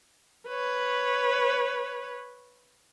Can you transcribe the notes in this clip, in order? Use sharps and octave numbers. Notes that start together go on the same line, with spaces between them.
B4 C#5